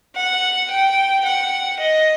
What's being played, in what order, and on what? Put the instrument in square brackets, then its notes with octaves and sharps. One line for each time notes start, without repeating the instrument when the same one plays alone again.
[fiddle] F#5
G5
F#5
D#5